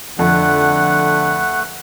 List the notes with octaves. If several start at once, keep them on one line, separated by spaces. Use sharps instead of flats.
F2 D3 A3 B4 F#5